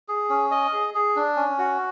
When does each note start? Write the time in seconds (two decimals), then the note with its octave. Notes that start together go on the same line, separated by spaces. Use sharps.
0.08 G#4
0.30 C#4
0.51 D#5
0.73 G#4
0.95 G#4
1.16 D4
1.36 C#4
1.58 F#4